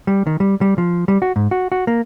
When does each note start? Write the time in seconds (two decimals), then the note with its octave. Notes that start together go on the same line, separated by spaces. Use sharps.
0.07 G3
0.27 D#3
0.40 G3
0.61 G3
0.78 F3
1.08 G3
1.22 F#4
1.36 G#2
1.51 F#4
1.72 F#4
1.87 A#3